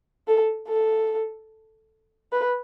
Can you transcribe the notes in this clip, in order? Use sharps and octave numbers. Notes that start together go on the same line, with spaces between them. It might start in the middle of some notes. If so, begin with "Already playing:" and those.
A4
A4
B4